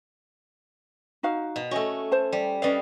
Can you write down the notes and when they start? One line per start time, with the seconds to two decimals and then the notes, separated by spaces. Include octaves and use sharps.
1.23 D#4 F#4 F5
1.56 B2
1.71 A3 C#4 F#4 D#5 G#5
2.12 A4 C5 A5
2.32 G3
2.62 G3 C#4 B4 D5 D#5 F5